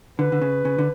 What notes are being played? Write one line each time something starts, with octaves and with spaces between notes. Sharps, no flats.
D3 B4
D3
C#3
C#3
D3